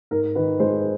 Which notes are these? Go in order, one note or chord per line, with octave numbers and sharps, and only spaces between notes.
G#2 A#4
D#3 B4
G#3 C5